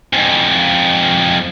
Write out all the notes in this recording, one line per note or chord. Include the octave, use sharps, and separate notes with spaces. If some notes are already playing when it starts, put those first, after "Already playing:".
F2 G#2